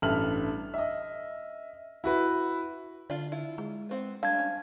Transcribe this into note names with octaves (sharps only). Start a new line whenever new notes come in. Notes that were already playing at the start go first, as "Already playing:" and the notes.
A1 G2 A4 E5 F6 F#7
D#5 E5
E4 F#4 B4
D3 D4 F4
E4 F4
G#3
B3 C4 F#5
G3 A3 D4 F5 A5 G#6
C#4